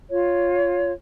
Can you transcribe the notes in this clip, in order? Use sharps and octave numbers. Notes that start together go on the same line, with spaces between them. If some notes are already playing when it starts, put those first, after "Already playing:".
F4 C#5